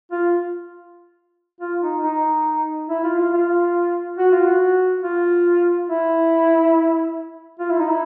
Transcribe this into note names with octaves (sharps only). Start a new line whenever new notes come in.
F4
F4
D#4
D#4
E4
F4
F4
F4
F#4
F4
F#4
F4
E4
F4
E4
D#4
E4